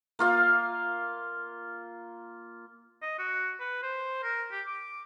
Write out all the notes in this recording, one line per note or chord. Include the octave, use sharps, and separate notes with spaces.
A#3 F4 F5
D#5
F#4
B4
C5
A#4
G4
D6